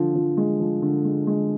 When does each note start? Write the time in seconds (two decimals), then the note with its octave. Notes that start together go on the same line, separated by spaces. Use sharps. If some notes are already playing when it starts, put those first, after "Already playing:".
Already playing: D3 F3
0.15 F3
0.37 G#3
0.60 F3
0.82 D3
1.05 G#3
1.27 G#3